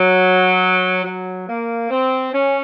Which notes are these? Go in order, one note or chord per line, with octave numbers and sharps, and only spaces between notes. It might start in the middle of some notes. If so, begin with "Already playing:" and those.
Already playing: F#3
F#3
A#3
C4
C#4